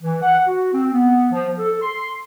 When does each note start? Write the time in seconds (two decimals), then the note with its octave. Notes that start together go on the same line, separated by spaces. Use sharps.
0.02 E3
0.22 F#5
0.47 F#4
0.73 C4
0.93 B3
1.32 F3
1.58 A4
1.82 C6